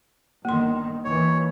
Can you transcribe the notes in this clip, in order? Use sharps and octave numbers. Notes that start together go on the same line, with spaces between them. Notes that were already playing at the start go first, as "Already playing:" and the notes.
G1 D#3 A#3 C6
D#2 E3 C#5